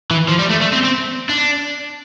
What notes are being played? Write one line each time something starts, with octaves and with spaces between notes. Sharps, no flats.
E3
F3
G3
A3
A3
C4
C4
D4